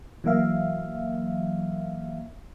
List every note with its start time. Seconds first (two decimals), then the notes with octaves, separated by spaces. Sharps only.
0.24 E3 F#3 A#3 E5 F5